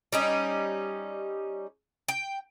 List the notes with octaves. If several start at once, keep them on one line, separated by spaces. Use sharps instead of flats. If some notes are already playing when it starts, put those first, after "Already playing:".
G3 C#4 D#4
G5